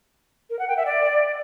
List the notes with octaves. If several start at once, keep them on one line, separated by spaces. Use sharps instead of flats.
A#4
F#5
G5
E5
D5